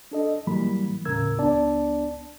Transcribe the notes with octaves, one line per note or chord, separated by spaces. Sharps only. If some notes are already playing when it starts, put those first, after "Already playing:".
D4 A4 D#5
G#2 E3 F#3 G3 A#3 B5
D#2 A2 C#3 A#4 E6 G#6
C#2 B3 D4 D5 A5